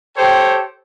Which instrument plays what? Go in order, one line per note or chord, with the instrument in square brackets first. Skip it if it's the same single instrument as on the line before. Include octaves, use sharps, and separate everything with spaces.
[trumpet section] G4 A4 C5 C#5 G5